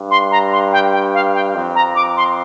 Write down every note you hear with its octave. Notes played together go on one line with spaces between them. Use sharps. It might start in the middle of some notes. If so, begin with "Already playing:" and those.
Already playing: G2
C6
A#5
C6
G5
G5
F5
G5
F2
A#5
D6
C6